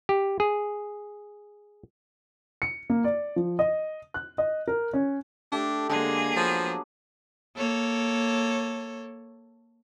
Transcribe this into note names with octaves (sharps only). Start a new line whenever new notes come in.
G4
G#4
C#7
A#3
D5
F3
D#5
F#6
D#5
A#4
C#4
A3 D4 G4
D3 G#3 A#3 D4 G#4
F3 F#3 B3
A#3 A4 C#5